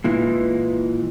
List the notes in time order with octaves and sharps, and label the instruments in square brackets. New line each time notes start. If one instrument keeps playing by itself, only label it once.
[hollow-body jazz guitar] A#2 E3 G#3